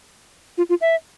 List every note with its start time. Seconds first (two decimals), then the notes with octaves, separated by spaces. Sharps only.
0.58 F4
0.69 F4
0.81 E5